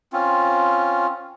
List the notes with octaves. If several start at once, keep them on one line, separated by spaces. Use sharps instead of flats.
C4 C#4 F4